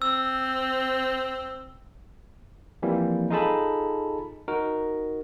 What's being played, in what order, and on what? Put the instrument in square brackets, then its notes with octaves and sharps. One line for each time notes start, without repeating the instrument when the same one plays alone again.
[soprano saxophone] C4 [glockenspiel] E6
[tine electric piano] E3 F3 G3 A#3 C4
D#4 F4 G#4 A4 A5 B5
D#4 F#4 A#4